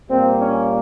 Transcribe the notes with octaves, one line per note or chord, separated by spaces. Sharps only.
A#2 G3 A#3 C4
C#4